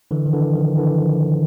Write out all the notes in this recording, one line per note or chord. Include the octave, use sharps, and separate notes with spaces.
D3 E3
D#3
D3 E3
D#3 F3
D3 E3
D#3 F3